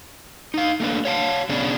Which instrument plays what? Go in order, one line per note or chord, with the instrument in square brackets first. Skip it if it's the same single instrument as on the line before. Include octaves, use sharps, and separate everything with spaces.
[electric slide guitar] D#4 F5
A3 A#3 D4 B4
C#5 F5 A5
C#3 B3 C#4 D4 G#4